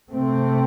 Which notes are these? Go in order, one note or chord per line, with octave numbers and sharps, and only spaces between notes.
C3 A3 C4